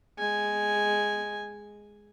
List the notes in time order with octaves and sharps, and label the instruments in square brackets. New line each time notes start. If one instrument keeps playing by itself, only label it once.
[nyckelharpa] G#3 G#5